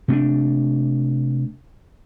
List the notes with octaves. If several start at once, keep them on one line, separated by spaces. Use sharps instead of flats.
C3 A3 D4